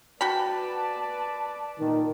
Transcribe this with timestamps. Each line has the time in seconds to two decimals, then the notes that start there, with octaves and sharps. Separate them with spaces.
0.21 F#4 B4 D5 G5 A5 B5
1.80 A#2 D#3